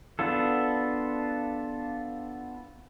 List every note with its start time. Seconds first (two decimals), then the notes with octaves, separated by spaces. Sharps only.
0.19 B3 D4 F4 A4